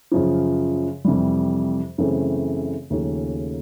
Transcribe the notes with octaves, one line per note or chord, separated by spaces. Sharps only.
F#2 C#3 F3
F2 C3 E3 G3
F#2 C#3 E3 A3 C4
D#2 C#3 F3 A3 C#4